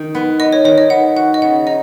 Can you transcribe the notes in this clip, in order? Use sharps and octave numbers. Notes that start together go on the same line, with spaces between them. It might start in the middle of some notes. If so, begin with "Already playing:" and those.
Already playing: D#3
B3
B3 D#5
C#5
D#3 C#5
D#5
B3 F#5
F#4 F#5
D#5
C#3 F#5
D#4 D#5